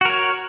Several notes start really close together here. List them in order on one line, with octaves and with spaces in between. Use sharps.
F#4 A#4 C#5